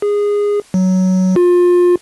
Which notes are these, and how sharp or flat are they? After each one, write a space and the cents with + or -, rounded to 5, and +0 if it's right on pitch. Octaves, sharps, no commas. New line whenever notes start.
G#4 -15
F#3 +10
F4 +25